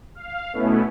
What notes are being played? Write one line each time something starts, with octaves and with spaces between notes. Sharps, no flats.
F5
B2 A3 B3 C#4 E4